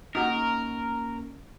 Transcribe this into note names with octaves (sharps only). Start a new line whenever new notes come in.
A#3 C#4 D#4 F#4 A#4